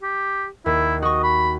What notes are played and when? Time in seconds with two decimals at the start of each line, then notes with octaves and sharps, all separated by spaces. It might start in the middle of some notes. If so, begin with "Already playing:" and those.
0.02 G4
0.66 D#2 E4
1.02 F#4 D#5 C#6
1.24 B5